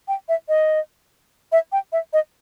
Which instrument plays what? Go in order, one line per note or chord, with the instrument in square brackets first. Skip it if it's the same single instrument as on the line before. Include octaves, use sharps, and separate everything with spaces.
[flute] G5
E5
D#5
E5
G5
E5
D#5